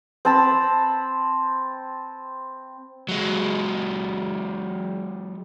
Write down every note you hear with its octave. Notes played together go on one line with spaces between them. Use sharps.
C4 A5 B5
F#3 G#3